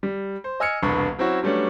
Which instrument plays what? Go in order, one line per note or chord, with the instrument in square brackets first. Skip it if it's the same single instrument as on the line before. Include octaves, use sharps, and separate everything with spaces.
[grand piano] G3
C5
D#5 G#5 E6 F6 G#6 C#7
E1 C2 D3 B3 B5 C#6
F#3 C4 C#4 E4 F#4
F#3 G3 A3 B3 C#4 D4